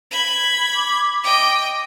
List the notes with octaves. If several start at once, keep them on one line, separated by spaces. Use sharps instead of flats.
B5 G#6
D6
D#5 G5